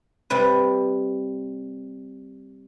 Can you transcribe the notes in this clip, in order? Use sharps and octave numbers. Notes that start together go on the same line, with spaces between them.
C3 G3 B4